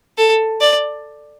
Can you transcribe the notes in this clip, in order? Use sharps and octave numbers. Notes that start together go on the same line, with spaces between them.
A4
D5